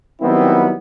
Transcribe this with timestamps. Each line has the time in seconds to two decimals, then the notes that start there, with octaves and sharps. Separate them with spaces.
0.21 D#3 F#3 G3 B3 C4 E4